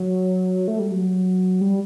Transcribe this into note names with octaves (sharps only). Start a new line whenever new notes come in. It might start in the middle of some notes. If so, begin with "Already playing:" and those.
Already playing: F#3
A3
G3
F#3
G3